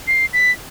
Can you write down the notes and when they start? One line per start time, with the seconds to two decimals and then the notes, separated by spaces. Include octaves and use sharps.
0.07 C7
0.33 B6